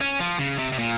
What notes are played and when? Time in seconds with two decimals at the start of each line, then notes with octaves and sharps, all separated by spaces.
0.01 C#4
0.20 F3
0.39 C#3
0.59 C3
0.73 C3
0.79 A#2